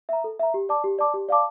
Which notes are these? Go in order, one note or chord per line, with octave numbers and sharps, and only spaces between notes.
E5 A#5
A4
E5 A#5
G4
D5 A5 D6
G4
D5 A5 D6
G4
D5 F5 A5 D6